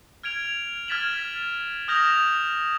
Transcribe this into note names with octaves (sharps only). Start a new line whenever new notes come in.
F6 G#6 D7 F7
F6 G#6 A6 B6 E7 F#7
D#6 F6 G6 A#6 E7 F7